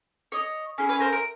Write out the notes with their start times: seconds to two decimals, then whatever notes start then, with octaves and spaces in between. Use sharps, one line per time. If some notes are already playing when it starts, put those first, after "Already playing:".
0.32 C#5 D#5
0.78 C#4 E4 G#4
0.89 B4 C#5
1.00 A#4 C5
1.13 A#4